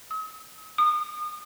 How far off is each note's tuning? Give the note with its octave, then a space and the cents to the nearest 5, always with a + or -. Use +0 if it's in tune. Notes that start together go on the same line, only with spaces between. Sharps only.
D#6 +45
D#6 -30